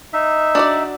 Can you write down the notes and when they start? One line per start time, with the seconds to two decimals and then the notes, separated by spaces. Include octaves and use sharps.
0.13 D#4 E5
0.55 D4 F#4 D5